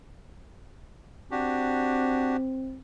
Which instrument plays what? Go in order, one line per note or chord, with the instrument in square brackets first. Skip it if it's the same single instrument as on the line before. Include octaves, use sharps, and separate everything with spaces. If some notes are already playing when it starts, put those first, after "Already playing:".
[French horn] C4 [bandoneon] D4 F#4 G4